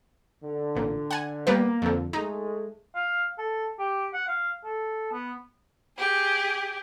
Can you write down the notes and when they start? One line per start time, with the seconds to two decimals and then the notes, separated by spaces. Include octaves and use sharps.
0.44 D3
0.75 A1 A#2
1.11 F#5 G#5
1.47 G3 A#3 B3 B4
1.82 F2 D3
2.13 G#3 A3 D#4
2.95 F5
3.38 A4
3.79 G4
4.13 F#5
4.28 F5
4.64 A4
5.12 B3
5.98 G4 G#4